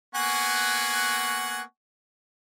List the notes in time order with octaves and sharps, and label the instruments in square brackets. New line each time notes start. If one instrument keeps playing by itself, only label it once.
[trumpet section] A#3 B3 [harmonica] F#5 G#5 C#6